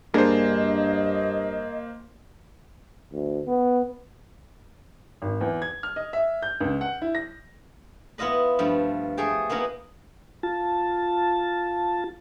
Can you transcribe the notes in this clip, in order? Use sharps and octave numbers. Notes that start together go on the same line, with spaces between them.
G2 A#3 D4 G#4 A#4 C5 D#5
D2
B3
G#1
E2
G#6
F6
D#5
E5
G6
C#2
F#5
E4
A#6
B3 E4 F4 D#5 B5
G2 F3 A3
A3 G#4 G5
A#3 B3 D#4 E4 A#4
F4 A5